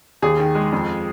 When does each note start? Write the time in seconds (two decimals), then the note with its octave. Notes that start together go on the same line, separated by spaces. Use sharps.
0.22 D#2 G#4
0.39 D#3
0.55 G#3
0.72 F2